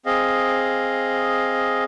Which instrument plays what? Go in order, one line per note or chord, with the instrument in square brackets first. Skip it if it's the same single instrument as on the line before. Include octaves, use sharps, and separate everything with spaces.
[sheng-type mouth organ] C4 G#4 D#5 F5